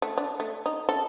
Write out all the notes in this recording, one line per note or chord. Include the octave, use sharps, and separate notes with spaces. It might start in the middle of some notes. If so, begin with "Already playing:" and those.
A3
D4
A3
D#4
A4